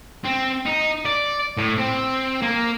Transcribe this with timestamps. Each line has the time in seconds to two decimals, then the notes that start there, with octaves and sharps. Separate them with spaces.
0.25 C4
0.66 D#4
1.05 D5
1.57 A2
1.78 C4
2.42 A#3